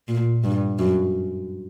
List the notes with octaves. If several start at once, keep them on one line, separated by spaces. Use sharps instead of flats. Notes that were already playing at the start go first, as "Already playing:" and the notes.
A#2
G2
F#2